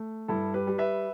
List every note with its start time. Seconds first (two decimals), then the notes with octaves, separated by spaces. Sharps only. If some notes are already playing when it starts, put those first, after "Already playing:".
Already playing: A3
0.28 G2 E4 A4
0.54 G4 B4
0.67 G3
0.78 B4 E5